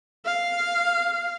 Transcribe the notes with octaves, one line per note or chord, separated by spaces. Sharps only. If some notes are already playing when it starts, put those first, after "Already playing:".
F5